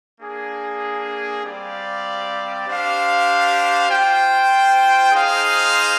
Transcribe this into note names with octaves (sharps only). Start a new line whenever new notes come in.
A#3 D4 G#4
G3 C4 G4 D5 F5
D4 G4 C5 F5
F4 C5 G5
D#4 G#4 C5 F5